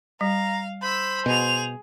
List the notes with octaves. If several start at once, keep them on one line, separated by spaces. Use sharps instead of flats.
G3 F5 A#5
C5 B5 E6
B2 G#4 F7